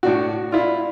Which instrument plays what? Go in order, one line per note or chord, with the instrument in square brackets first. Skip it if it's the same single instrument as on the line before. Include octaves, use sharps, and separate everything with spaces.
[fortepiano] A2 D4 F#4
[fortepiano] E4 F4 [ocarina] D5